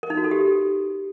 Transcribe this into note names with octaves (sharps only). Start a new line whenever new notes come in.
A#4
D#4
F#4
A4
G4